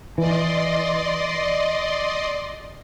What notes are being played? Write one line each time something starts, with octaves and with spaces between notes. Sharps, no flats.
E3 D5 D#5 C6